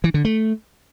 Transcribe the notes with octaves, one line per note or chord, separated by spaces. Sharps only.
E3
D3
A3